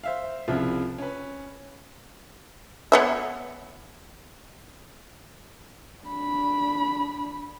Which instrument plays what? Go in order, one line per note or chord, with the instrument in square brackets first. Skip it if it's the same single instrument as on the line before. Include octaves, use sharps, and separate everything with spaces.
[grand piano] C5 E5 F5
C2 C#3 F3 E4 F4
C#4 B4
[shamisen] B3 C#5 E5
[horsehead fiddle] D4 B5